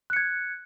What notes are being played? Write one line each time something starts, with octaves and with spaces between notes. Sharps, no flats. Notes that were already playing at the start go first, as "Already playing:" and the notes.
F#6 G#6 C#7